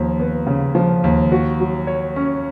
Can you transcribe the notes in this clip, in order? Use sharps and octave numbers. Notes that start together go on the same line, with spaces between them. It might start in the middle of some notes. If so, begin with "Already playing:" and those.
Already playing: D#2 F3
B3
C#3
F3
D#2
F#4
F#3
C#5
C#4